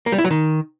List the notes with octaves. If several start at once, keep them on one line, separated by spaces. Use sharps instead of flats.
A#3
G3
E4
F#3
D#3